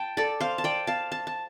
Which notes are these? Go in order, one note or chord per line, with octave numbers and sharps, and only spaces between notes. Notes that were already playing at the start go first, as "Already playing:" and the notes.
Already playing: G5 A5
A4 D5
C5 F5
A5
D5 G5
F5 A5
A5
A5